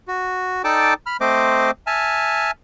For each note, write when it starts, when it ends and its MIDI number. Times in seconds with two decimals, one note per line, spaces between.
0.08 0.62 66
0.64 0.94 63
0.64 0.94 69
0.64 0.94 74
0.64 0.94 79
0.64 0.94 81
0.64 0.94 86
1.06 1.17 83
1.06 1.17 89
1.21 1.71 57
1.21 1.71 60
1.21 1.71 72
1.21 1.71 75
1.21 1.71 86
1.87 2.51 76
1.87 2.51 80
1.87 2.51 81
1.87 2.51 89